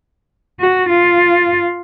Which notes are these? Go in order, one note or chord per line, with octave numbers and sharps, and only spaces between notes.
F#4
F4